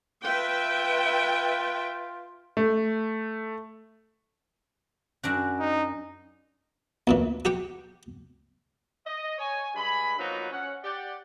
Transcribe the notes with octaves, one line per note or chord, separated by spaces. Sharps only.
F4 B4 E5 G5
A3
F#2 D4 F#4
D#4
D2 A#2 E3
F#4 G4 G5 D6
D#5
C#5 G#5
G2 G#3 G#5 B5
F3 F#3 A#3 B3 D#4 F#4
C#4 F#5
G4 D5 F#5